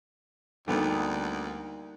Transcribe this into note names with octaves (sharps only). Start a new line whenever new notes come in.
D2 D3 G3 A#3 B3 D#4